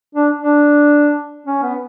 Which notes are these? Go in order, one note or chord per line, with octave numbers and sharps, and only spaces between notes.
D4
D4
C#4
B3